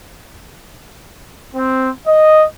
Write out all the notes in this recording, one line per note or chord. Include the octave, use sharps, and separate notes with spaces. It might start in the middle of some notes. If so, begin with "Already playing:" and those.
C4
D#5